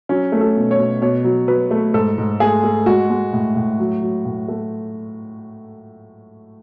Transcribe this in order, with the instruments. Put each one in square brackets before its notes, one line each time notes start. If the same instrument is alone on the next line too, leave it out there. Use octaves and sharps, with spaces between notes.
[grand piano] F#3 C#4
A3
A4
B2
C#5
B2
B2 C#5
F#3
F#3 B4
A3
G#2 A4
G#2
A3 G#4
A3
G#3 F#4
G#3
A2
A2
F#3
F#3
A2
A3